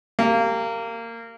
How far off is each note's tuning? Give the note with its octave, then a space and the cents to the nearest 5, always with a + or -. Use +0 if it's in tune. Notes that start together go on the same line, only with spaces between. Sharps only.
A#3 -20 G4 +0